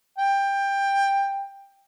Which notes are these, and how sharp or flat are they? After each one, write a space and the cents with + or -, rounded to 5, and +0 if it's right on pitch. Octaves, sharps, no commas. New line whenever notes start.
G5 +15